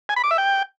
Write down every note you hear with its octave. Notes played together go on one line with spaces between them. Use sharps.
G#5
B5
D6
E5
G5